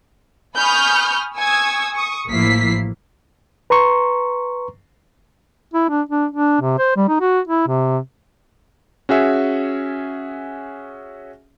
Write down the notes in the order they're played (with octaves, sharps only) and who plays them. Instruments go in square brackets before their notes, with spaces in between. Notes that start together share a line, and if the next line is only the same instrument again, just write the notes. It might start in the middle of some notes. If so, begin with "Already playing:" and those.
[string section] G#5 B5 C#6 D#6 F6 G6
G#5 C#6 D#6 E6 G#6
C#6 D#6
A1 F3 A#3 E4 B6 C7
[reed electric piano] B4 A#5 C6 C#6
[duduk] E4
D4
D4
D4
C3
C5
G3
D#4
F#4
E4
C3
[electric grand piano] C#4 F#4 G#4 E5